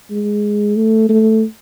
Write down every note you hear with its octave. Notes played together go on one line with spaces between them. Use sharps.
G#3
A3
A3